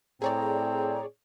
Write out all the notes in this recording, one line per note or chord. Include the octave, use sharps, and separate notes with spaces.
A2 C4 G#4 C#5 D5 A#5